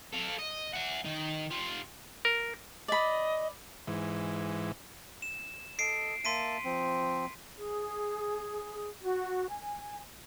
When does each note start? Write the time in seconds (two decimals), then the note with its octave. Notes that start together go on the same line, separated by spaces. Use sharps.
0.13 A4 F5
0.39 D#5
0.73 E5 F#5
1.05 D#3 D#4
1.51 F4 G4
2.25 A#4
2.88 D5 D#5 B5
3.87 G#2 E3
5.22 E7
5.79 A4 D#5 C7 D7
6.25 A#3 E5 A5 C6 B6 D#7
6.65 F3 C4
7.57 G#4
9.02 F#4
9.49 G#5